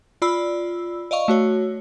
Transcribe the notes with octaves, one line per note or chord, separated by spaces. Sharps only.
F4 D5 B5 E6
D5 D#5 F5 C#6
A3 F#4 C#5